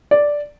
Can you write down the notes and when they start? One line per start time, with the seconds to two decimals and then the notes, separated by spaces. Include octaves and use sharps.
0.11 D5